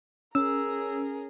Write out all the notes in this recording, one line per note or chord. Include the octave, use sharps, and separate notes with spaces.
C#4 G#4 A#4 E6